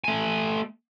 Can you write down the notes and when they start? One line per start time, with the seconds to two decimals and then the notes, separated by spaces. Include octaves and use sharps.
0.04 A3 G#5